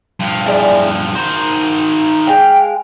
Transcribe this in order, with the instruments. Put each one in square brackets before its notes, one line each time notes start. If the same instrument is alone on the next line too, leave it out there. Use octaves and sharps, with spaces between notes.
[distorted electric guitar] G2 F3
[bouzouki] E4 G#4 D5
[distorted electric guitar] D#3 C5 [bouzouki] F#4
[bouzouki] G#3 F5 [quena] G5